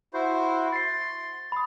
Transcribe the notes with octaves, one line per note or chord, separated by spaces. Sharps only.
E4 F#4 C5
C6 A6 C7
B5 D#6